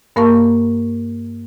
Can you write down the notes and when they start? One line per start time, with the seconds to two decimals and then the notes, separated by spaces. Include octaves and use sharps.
0.16 G2 A#3 A#4 F5 A5 C#6